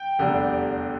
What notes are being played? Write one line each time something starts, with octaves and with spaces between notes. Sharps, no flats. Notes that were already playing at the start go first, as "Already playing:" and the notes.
Already playing: G5
F1 E2 D3 G3